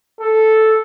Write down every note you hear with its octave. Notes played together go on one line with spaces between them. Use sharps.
A4